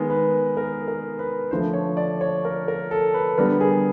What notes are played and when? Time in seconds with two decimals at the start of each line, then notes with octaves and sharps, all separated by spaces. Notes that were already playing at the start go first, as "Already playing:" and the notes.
Already playing: D#3 G#3 B3 A#4
0.10 B4
0.57 A#4
0.88 A#4
1.19 B4
1.51 D3 F3 A3 C5
1.73 C#5
1.97 D5
2.21 C#5
2.45 A#4
2.68 A#4
2.91 A4
3.14 B4
3.38 D3 G3 B3 A#4
3.61 G#4